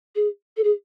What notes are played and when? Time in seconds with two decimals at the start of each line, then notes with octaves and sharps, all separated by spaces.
0.15 G#4
0.57 A4
0.64 G#4